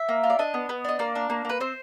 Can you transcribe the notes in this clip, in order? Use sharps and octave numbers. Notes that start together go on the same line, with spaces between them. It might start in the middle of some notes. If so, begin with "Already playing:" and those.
Already playing: E5
A#3
F4
D5
D4 D#5
B3
B3
D4 D#5
A#3 D5
D4
A#3
A#3 B4
C4 C5